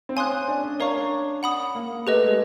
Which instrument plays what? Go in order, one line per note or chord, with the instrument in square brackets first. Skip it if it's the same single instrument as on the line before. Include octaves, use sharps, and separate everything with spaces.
[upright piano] C4
[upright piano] C#4 [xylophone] F5 G#5 C6 D#6 F#6
[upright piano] D4
C#4
[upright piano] D4 [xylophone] A#4 C#5 F5 A#5 C#6
[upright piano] C#4
[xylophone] F#5 B5 D#6
[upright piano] A#3
[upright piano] A3 [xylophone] G4 B4 D#5
[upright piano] G#3